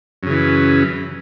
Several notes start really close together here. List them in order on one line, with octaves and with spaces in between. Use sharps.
F#2 C#3 E3